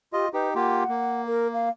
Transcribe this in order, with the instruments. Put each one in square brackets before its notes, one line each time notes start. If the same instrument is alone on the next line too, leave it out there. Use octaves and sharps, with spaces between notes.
[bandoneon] F4 D#5 [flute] G4
[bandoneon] D#4 G4 [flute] B4
[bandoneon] A#3 F4 G4 [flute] F#5
[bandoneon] A#3
[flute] A#4
F5